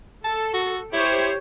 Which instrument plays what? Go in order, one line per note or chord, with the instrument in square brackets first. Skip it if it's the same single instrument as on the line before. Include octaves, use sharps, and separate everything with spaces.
[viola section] A4 [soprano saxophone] A5
[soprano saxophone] F#4
[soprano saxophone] E4 [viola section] G4 C5 C#5